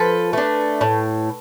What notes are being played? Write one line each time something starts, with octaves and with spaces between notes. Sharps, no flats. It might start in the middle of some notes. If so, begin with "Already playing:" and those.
Already playing: F3 A4 B4
A3 D4
A2